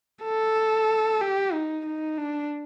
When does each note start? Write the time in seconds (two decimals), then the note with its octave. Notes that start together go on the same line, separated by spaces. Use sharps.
0.24 A4
1.21 G4
1.53 D#4
1.86 D#4
2.18 D4